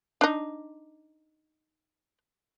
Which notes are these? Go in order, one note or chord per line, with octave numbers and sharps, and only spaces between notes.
D4 D#4